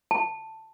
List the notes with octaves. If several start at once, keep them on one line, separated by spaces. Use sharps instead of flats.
A5